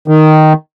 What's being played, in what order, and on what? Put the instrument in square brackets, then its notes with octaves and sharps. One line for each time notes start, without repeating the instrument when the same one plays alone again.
[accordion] D#3